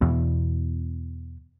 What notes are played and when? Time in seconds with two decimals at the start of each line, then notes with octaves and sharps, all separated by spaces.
0.01 E2 B2